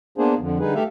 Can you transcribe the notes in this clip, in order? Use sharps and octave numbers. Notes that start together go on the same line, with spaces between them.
A#3 B3 D4 G#4 C5
F2 D3 F3
D3 G3 D#4 G#4 B4
A3 G4 A4 E5 F5